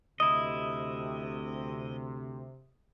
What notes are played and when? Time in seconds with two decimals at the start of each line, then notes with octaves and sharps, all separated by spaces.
0.20 D2 C3 E4 D#5 D#6